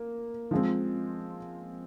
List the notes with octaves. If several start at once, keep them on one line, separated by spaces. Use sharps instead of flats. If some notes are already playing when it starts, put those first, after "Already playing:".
Already playing: A#3
F3 G#3 C4